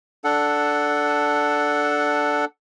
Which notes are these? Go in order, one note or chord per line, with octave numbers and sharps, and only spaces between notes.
D4 A4 F#5